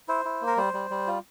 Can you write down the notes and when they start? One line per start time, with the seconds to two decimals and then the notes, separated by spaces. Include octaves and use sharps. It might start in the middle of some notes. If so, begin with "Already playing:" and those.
0.08 E4 C5
0.25 E4
0.42 A#3
0.47 A#4
0.57 G3 C5
0.73 G3
0.90 G3
1.07 F4